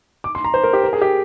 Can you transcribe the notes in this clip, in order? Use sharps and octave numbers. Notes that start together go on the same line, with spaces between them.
D6
C6
A#5
C5
A#4
G4
A#4
G#4
G4